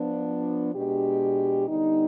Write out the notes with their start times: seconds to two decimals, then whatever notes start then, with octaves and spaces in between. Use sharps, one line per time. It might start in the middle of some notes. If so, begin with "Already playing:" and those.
Already playing: F3 B3 D4
0.74 B2 G#3 D4 G4
1.68 D3 G3 B3 D#4